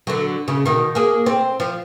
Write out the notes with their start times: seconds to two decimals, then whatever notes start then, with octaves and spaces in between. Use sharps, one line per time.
0.07 D3 F#3
0.48 C#3
0.66 B2 D#3
0.95 A#3 G#4
1.26 C4
1.60 F3